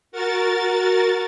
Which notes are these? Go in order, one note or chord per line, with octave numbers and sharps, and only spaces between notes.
F#4 A#4 A6